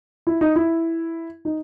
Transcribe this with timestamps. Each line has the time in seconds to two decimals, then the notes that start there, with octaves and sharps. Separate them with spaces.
0.27 E4
0.41 D#4
0.56 E4
1.45 D#4